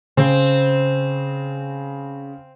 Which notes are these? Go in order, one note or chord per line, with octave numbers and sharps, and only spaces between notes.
C#3 C4